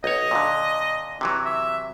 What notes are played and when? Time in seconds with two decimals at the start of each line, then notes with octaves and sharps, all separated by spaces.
0.04 B1 C#5 D#5
0.31 A#2 D3
1.21 C3 E3 F#3
1.45 E5